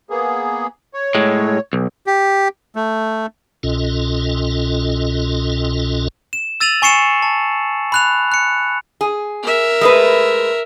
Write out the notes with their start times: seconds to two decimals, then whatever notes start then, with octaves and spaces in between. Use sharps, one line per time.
0.10 A#3 B3 G#4
0.94 C#5
1.15 A2 G#3
1.73 B1
2.07 G4
2.76 A3
3.63 C2 B2 C#4 F4 A4 D#5
6.33 E7
6.60 E6 A6 D#7 F7 F#7
6.82 G#5 C#6 C7 C#7 E7
7.22 A5
7.92 B5 F#6 F7
8.32 F#6 C#7
9.01 G#4
9.43 A#4 E5
9.81 G#3 A3 B4